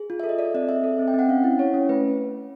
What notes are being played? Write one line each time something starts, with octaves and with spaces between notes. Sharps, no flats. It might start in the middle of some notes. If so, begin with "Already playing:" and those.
Already playing: G#4
F4
A4 E5
D#5
A4 D5
C4 D#5
C4 E5
A4
C4
G5
C4 F#5
C#4 F5
E4 F#5
E4 C#5
C#4
A3 B4